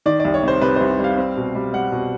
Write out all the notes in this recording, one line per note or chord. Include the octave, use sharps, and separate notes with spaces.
D#3 D5
C2 D5
C#5
C3 C5
C3 B4
C2 C5
G3 F5
C4
B2
G3
G3 F#5
B2